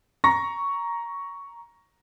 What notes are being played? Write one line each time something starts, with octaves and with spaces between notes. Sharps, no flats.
A#5 C#6 A#6